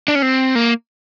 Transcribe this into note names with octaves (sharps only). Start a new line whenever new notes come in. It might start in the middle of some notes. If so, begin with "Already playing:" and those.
D4
C#4
C4
A#3